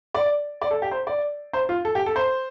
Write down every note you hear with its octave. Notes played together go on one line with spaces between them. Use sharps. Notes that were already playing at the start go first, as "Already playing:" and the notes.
D5
D5
A4
G4
C5
D5
C5
F4
A4
G4
A4
C5